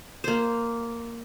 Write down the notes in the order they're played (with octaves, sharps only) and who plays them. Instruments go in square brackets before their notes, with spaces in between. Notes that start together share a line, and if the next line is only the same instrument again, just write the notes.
[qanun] A#3 C5